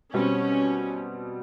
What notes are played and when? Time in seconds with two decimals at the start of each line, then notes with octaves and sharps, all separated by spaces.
0.14 B2 G3 C4 C#4